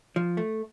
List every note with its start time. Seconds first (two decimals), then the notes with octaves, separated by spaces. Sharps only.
0.16 F3
0.37 A3